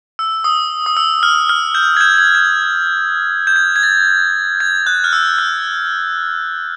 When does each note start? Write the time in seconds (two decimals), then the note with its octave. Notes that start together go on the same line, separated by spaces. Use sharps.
0.19 E6
0.44 D#6
0.86 D#6
0.97 E6
1.23 F6
1.49 F6
1.75 G6
1.97 G#6
2.01 G6
2.14 G6
2.18 G#6
2.35 G6
3.47 G6
3.56 G#6
3.76 G#6
3.83 A6
4.60 G#6
4.87 F#6
5.04 F6
5.13 E6
5.39 F6